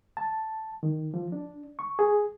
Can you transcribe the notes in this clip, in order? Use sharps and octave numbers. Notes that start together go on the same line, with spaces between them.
A5
D#3
F3
D4
C#6
G#4